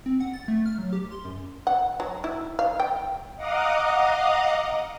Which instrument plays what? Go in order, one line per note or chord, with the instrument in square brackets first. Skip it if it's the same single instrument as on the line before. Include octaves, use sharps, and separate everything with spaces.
[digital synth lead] C4
F#5
A6
A3
F6
F#3
G4
C6
F#2
[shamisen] F#5
F#3
E4
F5
G5
[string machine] D#5 F5 F#5 A#5 D6 D#6